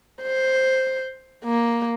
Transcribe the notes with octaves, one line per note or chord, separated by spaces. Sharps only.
C5
A#3